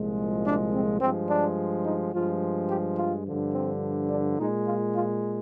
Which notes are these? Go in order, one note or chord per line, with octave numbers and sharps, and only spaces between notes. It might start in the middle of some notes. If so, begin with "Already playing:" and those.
Already playing: C2 A#2 F3 G#3
D4
C4
G2 F3 G#3 C4
D4
D#4
G2 F3 G#3 F4
G4
F4
G2 D3 F3
C4
D4
A#2 G#3 D#4
F4
F4